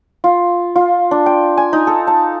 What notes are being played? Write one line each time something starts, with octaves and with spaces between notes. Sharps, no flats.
F4
F4
D4
G5
G#5
D#4
A4
A5